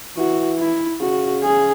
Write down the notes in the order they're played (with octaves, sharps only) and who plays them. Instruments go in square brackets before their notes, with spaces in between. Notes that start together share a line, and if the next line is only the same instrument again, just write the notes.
[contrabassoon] E3 [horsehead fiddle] F#4
[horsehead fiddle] E4
[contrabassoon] C#3 [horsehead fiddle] F#4
[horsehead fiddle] G#4